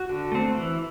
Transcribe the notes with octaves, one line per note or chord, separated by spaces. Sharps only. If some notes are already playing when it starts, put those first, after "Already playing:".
Already playing: F#4
D3
A3 C4
E3